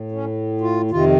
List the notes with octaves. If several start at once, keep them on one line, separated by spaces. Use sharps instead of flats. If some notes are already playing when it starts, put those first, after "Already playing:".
Already playing: A2
C#4
F4
F2 C3 D#3 F4